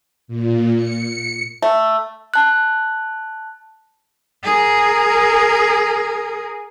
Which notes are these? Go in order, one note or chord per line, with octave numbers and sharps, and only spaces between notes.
A#2
C#7
A3
A5 F#6
G#4 A#4